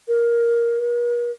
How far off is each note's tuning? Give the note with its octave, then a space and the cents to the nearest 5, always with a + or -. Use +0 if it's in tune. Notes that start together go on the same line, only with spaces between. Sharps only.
A#4 +10
A#4 +45